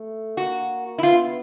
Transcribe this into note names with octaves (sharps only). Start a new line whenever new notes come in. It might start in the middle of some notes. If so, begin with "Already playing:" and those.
Already playing: A3
A#3 F#4
E4
B3 F4